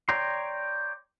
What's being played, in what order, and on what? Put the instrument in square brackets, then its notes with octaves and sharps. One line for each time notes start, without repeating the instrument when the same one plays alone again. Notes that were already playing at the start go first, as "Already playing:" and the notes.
[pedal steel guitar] C#5 D5 G5 A#5 C6